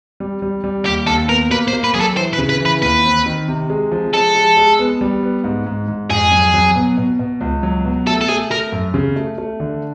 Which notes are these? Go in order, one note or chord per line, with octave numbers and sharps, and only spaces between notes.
G3
G3
G3
D#2 G4
D#2 A4
B3 A#4
A#3 B4
C5
A#3
B4
F#3 G#4
A4
E3 C5
B4
C#3
B4
E3
B4
D#2 B4
C4
D#3
C3
G#3
F3
G#3 A4
G#3
G#3
B3
G3
B3
G#2
G#2
G#2
F2 G#4
F#3
F#3
B2
B2
B2
C#2
F#3
B2
A3 A4
A4
A3 G#4
A3 A#4
F#2
C#3
A3
A3
D3